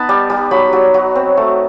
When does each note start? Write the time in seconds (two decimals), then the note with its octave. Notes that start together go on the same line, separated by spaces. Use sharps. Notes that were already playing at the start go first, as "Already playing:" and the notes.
Already playing: B3 D#4 A5 B5
0.09 G3
0.30 G3
0.51 F#3 B5
0.73 F#3
0.94 F#3
1.15 C4
1.37 A3